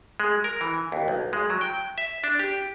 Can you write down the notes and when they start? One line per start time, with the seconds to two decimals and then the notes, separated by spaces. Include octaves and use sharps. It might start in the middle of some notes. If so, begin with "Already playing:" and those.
0.20 G#3
0.44 A#4
0.61 E3
0.92 D#2
1.08 B1
1.33 G#3
1.50 F#3
1.61 G5
1.98 E5
2.24 D4
2.39 G4